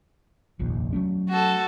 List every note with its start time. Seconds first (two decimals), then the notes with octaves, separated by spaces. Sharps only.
0.59 F1 A#1 D#2
0.93 F#3 A3 C#4
1.30 F#4 A4